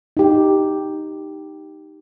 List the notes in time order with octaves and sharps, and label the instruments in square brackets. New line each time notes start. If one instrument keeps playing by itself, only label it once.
[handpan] D#4 G4